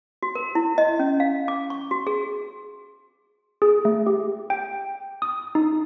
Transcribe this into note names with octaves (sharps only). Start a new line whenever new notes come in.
F#4
A#4
E4
D#5
C#4
F5
D6
C#6
F#4
G#4
G#4
A3
G4
G5
D#6
D#4